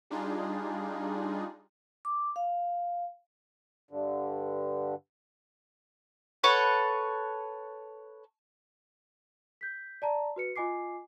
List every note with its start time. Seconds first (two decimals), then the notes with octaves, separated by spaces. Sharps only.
0.10 G3 D4 D#4 F4 G#4
2.05 D6
2.36 F5
3.91 G2 D3
6.43 A4 B4 C#5 F#5
9.61 G6 B6
10.02 D5 A5 A#5
10.36 F#4 B4 C#7
10.56 F4 D#5 G#5 D6 C7